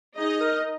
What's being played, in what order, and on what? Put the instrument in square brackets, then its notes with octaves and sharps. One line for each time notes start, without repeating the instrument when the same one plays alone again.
[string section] D#4 D#5 [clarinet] G#4
[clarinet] A#4